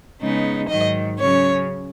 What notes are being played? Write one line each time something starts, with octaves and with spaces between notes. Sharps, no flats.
C#3 G#3 B3 D#4
G#2 D#3 F#3 D#5
C#3 F#3 C#4 C#5